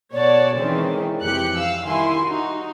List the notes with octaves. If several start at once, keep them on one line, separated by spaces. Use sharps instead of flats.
B2 C#5 D5 F#5 A5
D#3 E3 G#3 C4 C#4
F2 C3 E3 G4 F#6 C#7
F5 E6
D#3 G3 E4 G#5 C6
D#4 F#4